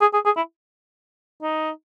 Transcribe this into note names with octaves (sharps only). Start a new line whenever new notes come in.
G#4
G#4
G#4
E4
D#4